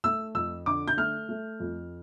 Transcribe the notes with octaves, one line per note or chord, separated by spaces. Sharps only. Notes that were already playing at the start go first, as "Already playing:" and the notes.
A3 E6
F2 E6
D3 D6
G6
A3 F6
A3
F2